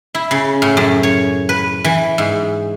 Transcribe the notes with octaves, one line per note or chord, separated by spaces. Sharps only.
E4
C#3
A2
F#2
C#5
B4
E3
G#2